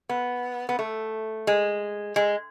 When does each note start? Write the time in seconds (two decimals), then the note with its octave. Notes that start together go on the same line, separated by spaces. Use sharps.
0.09 B3
0.69 B3
0.79 A3
1.47 G#3
2.16 G#3